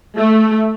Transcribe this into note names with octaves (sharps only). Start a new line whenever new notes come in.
A3